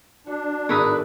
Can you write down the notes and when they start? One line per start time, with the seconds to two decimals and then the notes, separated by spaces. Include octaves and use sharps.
0.27 D4 F#4
0.69 G#1 A2 B3 G#4 A#4 B4 D#6 E6